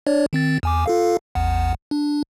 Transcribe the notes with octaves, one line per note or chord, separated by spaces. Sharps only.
D4 C#5 D5
D#3 C4 A6
E2 G#5 D6
F4 A4 F5
A1 E2 F#5
D4